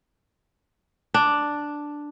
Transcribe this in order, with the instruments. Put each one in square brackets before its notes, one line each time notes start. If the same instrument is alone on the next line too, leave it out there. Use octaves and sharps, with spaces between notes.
[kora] D4